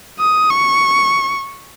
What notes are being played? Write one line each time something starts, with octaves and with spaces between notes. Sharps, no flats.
D#6
C#6